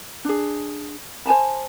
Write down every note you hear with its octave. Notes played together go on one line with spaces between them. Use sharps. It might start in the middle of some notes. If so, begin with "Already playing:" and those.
D4 G#4
C5 G#5 A5 B5